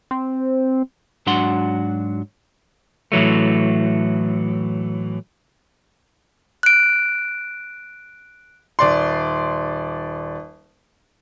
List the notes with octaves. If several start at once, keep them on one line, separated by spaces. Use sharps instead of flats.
C4
G#2 F#3 D4 F#4 F#5 C6
A2 E3 F#3 A3
F#6 D7
D#1 D5 C6